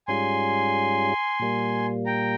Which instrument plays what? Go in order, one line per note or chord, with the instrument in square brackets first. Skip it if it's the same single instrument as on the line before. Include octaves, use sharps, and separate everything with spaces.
[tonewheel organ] G#2 G3 C#4 F4 G#4 [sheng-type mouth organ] G#5 C6
[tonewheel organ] A#2 G3 A#3
[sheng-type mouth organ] G5 A#5